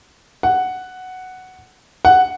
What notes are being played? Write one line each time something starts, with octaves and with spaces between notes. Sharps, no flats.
F#5
F#5